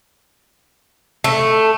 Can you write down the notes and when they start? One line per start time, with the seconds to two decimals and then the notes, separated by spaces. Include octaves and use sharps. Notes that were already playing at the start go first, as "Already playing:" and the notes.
1.24 A3